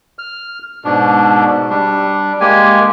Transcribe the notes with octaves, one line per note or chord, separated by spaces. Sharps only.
F6
G#2 B2 D4
G3 D4
G#3 A#3 G4 G#5